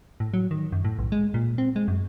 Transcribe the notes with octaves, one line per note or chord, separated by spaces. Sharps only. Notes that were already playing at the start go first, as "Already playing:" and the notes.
A2
F#3
D#3
F#2
A2
B1
G#3
A#2
C4
G#3
F#2